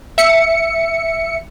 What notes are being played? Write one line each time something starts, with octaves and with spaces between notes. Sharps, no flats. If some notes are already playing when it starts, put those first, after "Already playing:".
E5 C#7